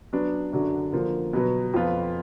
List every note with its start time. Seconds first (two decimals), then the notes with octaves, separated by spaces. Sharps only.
0.13 F#3 B3 D4
0.53 F#2 D3 F#3 D4
0.93 D3 F3 A#3
1.33 B2 F#3 B3
1.74 F2 F3 B3 F4 B4